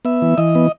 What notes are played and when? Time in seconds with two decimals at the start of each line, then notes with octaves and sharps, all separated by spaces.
0.05 B3 E5
0.22 E3
0.38 E3 D#5
0.55 B3